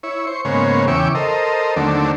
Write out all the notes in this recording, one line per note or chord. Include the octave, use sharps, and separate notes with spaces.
E4 C#5
C5 C#6
G#2 C#3 A#3 B3 C5 C#5
E2 C#3 E5 G5 C#6 D6
A4 A#4 C5 D#5
D#2 D3 F#3 A3 C4 D4